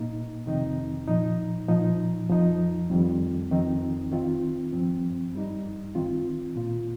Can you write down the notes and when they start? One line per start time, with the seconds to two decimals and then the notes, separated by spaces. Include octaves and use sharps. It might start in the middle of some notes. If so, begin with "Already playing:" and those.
Already playing: A#2 A#3 D#4
0.46 F2 C3 D#3 C4 D#4
1.08 A#2 F3 D#4
1.68 A#2 F3 D#4
2.29 F2 F3 D#4
2.90 F2 D#3 G3 C4
3.51 F2 D#3 C4 D#4
4.12 D#3 C4 F4
4.73 G2 F3 C4
5.33 G2 G3 D#4
5.95 D#3 C4 F4
6.56 A#2 A#3 F4